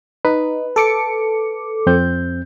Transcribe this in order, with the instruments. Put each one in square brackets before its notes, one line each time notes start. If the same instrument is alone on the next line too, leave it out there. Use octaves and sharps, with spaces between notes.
[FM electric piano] D#4 [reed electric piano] B4
[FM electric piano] A4 D6 C#7
[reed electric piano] F2 C4 G6